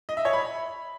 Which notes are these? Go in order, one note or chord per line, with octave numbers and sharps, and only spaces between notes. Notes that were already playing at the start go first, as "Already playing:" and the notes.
D#5
E5
C#5
B5